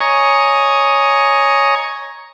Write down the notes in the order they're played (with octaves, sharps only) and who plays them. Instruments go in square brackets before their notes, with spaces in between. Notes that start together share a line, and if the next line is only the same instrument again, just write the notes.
[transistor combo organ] C#5 D#5 G#5 A#5 C#6